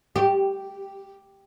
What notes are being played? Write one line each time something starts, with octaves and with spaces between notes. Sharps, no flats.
G4